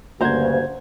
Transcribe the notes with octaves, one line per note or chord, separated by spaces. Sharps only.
D2 G2 C#3 A#3 C5 F#5 A#5 G#6